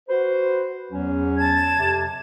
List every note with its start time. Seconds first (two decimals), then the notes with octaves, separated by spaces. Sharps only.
0.09 F#4 B4 C5
0.92 E2 F#3 C#4
1.37 A5 G#6
1.77 F2 C3